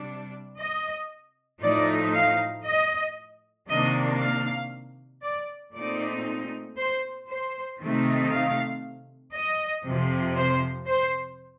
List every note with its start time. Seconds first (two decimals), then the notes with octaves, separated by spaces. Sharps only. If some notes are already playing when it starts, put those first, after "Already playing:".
Already playing: C3 G3 D4
0.59 D#5
1.62 A2 F3 A3 D#4 D5
2.14 F5
2.64 D#5
3.68 C3 D#3 A#3 D4 D#5
4.19 F5
5.22 D5
5.73 A#2 A3 C4 D#4 D5
6.76 C5
7.28 C5
7.80 C3 D#3 A3 C4 D#4
8.31 F5
9.34 D#5
9.86 F2 C3 F3
10.36 C5
10.88 C5